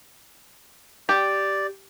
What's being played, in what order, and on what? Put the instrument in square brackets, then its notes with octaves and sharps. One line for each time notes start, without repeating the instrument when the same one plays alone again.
[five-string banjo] G4 [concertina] D5